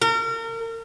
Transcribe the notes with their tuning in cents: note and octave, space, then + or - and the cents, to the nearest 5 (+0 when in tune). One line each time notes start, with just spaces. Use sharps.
A#4 -35